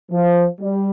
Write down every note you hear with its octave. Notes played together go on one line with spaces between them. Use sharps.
F3
G3